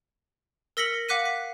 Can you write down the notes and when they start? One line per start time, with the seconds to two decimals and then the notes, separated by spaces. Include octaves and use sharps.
0.77 A#4 E6 A#6 B6 C#7 F#7
1.09 F5 F#5 D6 F#6 B6 D#7
1.25 B6